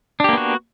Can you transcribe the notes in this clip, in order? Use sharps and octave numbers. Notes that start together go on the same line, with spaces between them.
A#3 B3 D4 F#4 G4